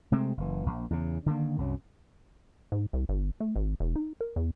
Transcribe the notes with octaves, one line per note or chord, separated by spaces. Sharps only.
C3 G#3 A3 C4
F#1 E3
A#1
E2 C#3
D3 D#3 A#3
C2 F#2 F#3
G#2
C2
G1
A3
G#1
E1
D#4
A#4
E2